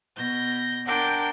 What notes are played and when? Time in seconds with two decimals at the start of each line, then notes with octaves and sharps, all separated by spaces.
0.17 B2 G6 A#6
0.87 D4 A#4 F#5 G5 C6 D6